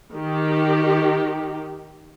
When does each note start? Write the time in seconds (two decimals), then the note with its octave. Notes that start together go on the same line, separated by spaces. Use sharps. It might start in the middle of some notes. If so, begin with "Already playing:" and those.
0.13 D#3 G4